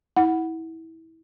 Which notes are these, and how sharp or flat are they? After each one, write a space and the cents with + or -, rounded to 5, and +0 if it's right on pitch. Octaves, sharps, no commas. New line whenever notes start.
E4 -25 F#5 +0 B5 +0